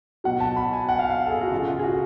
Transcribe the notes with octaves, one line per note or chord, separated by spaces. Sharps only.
B2 F#3 F#5
A5
B5
G#5
F#5
F5
F5
A4
G#4
F#4
C#3 F3 F4
F4
G#4
F#4